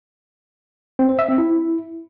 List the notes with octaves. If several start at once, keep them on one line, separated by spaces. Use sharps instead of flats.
C4
C5
E5
C4
E4